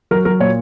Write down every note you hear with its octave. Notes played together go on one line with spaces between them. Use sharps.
F#3 A#4
F#3 A#4
A#2 C#5